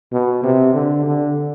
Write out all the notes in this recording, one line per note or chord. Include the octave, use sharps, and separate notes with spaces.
B2
C3
D3
D3